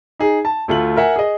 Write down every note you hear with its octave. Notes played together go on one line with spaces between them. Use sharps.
D#4 G#4
A5
D2 A3 F4 F#7
A#4 E5 F#5 G#5
G#4 D#5